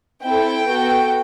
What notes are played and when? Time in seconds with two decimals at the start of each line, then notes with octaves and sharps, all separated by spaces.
0.24 C4 E4 A4 G5
0.67 B3 F#4 A4